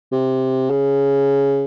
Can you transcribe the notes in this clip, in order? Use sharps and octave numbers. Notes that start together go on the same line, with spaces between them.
C3
C#3